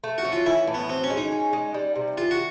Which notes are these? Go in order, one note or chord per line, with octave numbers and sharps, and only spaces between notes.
A3
F#4
C#4
F4
E3 E4
A2
B3
C4 F#4
C#4
G#3
D#4
C#4
G#3
G3
C3
E3 F4
F#4